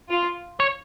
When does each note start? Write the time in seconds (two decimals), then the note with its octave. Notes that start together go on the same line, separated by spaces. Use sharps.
0.09 F4
0.60 C#5